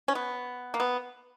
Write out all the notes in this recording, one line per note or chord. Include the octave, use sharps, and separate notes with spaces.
C#4
B3
A#3
B3